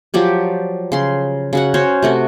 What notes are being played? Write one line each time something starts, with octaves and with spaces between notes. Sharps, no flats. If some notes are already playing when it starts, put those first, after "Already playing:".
F3 F#3 G4 D5
C#3 C6
C#3 F#4 F#5
C#4 F#4 C5 C#5
C3 A3 F#4